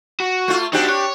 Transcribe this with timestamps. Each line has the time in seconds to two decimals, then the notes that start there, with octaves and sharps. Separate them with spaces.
0.20 F#4
0.48 A3 F4
0.73 C4 D4 D#4 F#4 G4
0.89 C#5